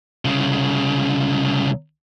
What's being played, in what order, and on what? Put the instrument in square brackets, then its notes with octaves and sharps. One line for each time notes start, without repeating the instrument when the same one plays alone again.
[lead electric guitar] C2 C#3